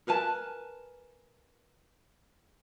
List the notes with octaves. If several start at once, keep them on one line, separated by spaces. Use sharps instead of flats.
A#4 B4 G#5 A5